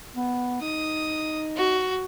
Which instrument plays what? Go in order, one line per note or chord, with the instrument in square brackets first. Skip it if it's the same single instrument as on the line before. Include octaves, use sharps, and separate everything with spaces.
[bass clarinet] B3
[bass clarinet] D#4 [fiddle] D#6
[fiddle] F#4